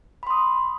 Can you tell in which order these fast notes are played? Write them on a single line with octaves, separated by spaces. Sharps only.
B5 C6 D#6